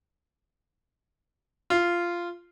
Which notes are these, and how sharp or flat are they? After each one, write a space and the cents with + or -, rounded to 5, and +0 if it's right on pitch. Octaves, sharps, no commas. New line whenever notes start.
F4 -10